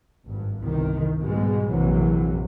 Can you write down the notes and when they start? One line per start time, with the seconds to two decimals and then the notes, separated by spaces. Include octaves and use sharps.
0.25 G#1 G2
0.61 G1 C2 C3 D#3
1.20 G#2 B2 G3 G#3
1.68 A#1 F#2 C3 E3 F#3